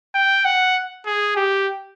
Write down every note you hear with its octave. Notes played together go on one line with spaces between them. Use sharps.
G5
F#5
G#4
G4